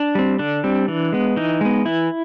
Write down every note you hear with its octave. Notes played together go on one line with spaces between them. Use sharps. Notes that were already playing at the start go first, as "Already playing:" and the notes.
Already playing: D4
G3 C4
D3 D4
G3 C4
E3
G#3 B3
E3 D#4
G#3 B3
E3 E4